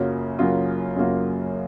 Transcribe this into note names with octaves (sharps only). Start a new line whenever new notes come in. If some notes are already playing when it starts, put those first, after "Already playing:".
Already playing: F#2 C#3 F#3 A#3 F4
F#2 C#3 F#3 A#3 F4
F#2 C#3 F#3 A#3 F4